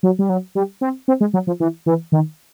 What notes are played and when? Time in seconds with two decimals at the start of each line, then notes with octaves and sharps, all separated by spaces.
0.03 F#3
0.19 G3
0.29 F#3
0.55 G3
0.81 C4
1.08 C4
1.21 G#3
1.34 F#3
1.47 F3
1.60 E3
1.86 E3
2.12 D#3